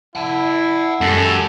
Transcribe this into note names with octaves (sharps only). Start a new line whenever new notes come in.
E4 F#5 A5
F#2 G#3 G4 A4